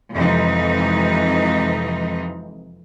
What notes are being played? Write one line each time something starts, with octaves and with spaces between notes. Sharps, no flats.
F2 C3 E3 G#3 D#4